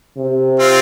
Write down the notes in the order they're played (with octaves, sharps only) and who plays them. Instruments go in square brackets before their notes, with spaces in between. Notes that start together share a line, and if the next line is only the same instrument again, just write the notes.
[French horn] C3
[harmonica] C4 F4